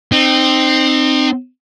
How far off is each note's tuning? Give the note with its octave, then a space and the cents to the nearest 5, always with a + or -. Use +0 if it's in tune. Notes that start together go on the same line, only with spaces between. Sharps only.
C4 +0 D#4 -30